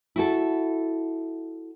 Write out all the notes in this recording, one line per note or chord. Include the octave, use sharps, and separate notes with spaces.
E4 F#4 A4